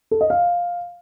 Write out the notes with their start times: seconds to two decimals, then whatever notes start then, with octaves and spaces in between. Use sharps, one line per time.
0.11 A4
0.21 D#5
0.30 F5